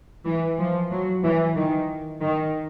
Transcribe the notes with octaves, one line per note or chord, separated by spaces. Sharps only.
E3
F3
F#3
E3
D#3
D#3